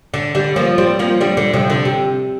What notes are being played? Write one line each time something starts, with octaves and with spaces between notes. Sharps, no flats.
D3
D3 G3
F3 A#3
G3 C4
F3 A#3
D3 G3
D3
C3 F3
D3
C3